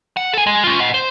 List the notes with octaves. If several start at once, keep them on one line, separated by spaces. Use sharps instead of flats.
F#5
A4 G#5
G#3
C#4 F4
D#5 F#5
C5